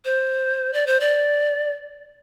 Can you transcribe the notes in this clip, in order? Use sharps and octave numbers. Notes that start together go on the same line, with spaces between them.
C5
D5
C5
D5